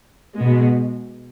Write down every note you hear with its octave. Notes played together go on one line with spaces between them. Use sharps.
B2 G#3